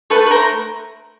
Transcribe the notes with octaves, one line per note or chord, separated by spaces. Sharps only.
A3 A4 B4
B4
A#4 C5